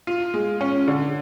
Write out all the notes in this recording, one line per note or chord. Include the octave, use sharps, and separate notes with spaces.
F4
G#3
C#4
D3